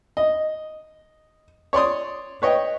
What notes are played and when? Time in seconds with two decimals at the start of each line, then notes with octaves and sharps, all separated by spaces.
0.17 D#5
1.73 C#5 D5 C6 D#6
2.42 B4 C#5 D#5 G5